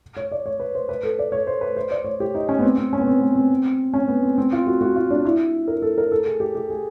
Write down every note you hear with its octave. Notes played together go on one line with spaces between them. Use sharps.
C#5
D5
C#5
B4
C5
B4
A4
D5
C#5
C5
B4
C5
D5
C#5
G4
D#4
C#4
B3
C4
C4
C#4
B3
C4
B3
C4
C#4
B3
C4
C4
F4
F#4
F#4
F4
D4
E4
A#4
A4
A#4
A4
G#4
G4
G4
G#4